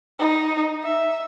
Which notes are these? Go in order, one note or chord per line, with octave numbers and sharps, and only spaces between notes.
D#4
E5